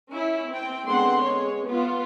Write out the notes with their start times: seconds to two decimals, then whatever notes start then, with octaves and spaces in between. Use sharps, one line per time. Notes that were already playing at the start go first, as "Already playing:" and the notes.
0.10 C#4 E4
0.50 C4 G5
0.86 D3 G#3 B3 C4 F#5 C6
1.22 G#3 C#5
1.67 B3 F4